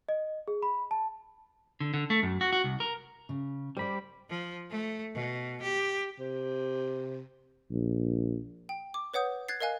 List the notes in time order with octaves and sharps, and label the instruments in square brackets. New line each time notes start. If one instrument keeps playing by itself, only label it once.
[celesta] D#5
G#4
B5
A5
[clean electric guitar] D3
D3
A3
F#2
F#4
F#4
C2
A#4
[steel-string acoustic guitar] C#3
[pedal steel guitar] G3 B5 [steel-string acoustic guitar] C5 D5
[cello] F3
A3
B2
G4
[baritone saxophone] C3
[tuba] A#1
[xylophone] G5
D6
B4 C#5 F#5 D#6 G6
F#6 G#6 A6 C7
A#4 D#5 F5 G#5 F#6